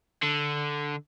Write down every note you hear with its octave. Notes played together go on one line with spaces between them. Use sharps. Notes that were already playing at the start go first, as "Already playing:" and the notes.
D3